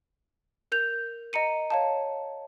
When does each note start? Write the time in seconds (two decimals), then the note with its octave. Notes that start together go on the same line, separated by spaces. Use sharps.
0.72 A#4 G6 F7
1.33 D#5 A#5 C#7 D#7
1.70 C#5 F5 A5